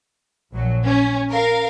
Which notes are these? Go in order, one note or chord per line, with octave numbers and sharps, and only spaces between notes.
A#1 F#3
C#4
A#4 F5